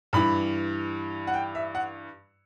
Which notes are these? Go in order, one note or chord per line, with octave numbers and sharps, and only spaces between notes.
G2 E3 B5
F#5
G5
E5
F#5